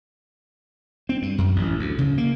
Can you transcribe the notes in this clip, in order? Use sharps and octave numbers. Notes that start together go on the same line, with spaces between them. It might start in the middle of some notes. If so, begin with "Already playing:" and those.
C4
G2
F#2
A1
D2
C#3
A#3